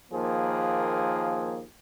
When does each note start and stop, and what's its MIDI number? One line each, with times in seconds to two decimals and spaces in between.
0.12 1.62 39
0.12 1.62 53
0.12 1.62 58
0.12 1.62 68